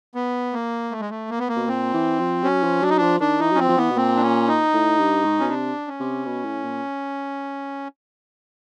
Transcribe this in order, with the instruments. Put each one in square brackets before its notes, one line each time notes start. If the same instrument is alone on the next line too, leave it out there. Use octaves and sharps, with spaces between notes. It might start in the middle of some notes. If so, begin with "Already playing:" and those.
[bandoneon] B3
A#3
A3
G#3
A3
A#3
B3
A#3
[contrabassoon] B2
[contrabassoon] A#2 [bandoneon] C4
[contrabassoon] E3
F3
[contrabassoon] F#3 [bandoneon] C#4
[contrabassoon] F3
[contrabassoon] F#3 [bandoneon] D4
[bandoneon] D#4
[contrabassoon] F3 [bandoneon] D4
[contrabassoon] D#3 [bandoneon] D4
[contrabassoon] E3 [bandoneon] D#4
[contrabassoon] F#3
[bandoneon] C#4
[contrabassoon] F3 [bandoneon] C4
[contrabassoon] F3
[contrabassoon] E3 [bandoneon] B3
[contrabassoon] B2
[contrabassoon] A#2 [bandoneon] C4
[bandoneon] D4
C#4
D#4
[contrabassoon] A2
G2
G#2
[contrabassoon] B2 [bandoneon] C#4
[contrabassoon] C3 [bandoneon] D4
[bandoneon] C#4
[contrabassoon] C3
B2
A2
A#2